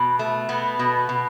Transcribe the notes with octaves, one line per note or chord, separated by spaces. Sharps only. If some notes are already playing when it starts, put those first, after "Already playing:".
Already playing: B2
A3
B2 B3
B2
B2